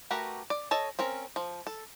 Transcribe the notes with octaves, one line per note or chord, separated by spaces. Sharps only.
A3 F#4 G4 A#4 B4
D5
A4 C#5 D#5 A5
C4 C#4 A#4
F3
A4